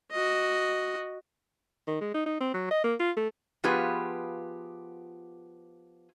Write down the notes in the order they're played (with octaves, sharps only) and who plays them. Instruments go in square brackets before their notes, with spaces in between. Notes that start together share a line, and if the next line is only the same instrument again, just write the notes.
[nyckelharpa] F#4 D#5
[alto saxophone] D#3
G#3
D#4
D#4
C4
F#3
D#5
A#3
F4
A3
[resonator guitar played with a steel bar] F3 B3 F4 G4 G#4 B4